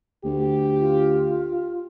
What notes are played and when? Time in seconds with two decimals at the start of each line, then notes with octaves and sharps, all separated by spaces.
0.25 D2 G4
0.79 F4